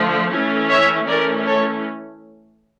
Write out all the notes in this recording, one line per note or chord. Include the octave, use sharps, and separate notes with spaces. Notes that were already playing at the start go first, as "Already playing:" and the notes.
Already playing: D3 F3 A3
E3 A3 C#4
C#5 E5
E3 A3 C#4 A#4 D5
A4 C#5